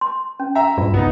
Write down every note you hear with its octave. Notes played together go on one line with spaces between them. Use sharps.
C6
C#4
E5 G5 A#5
G2 F4
C2 B3 D#4